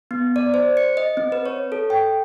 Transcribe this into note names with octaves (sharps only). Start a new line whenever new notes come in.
B3
D5
C5
C#7
D#5
C4
B4
C#5
A4
G5